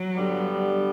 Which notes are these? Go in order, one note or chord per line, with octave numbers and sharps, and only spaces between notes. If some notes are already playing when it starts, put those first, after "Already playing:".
Already playing: F#3
G2 D3 G3 B3